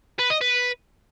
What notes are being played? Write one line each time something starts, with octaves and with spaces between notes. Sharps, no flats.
B4
D#5
B4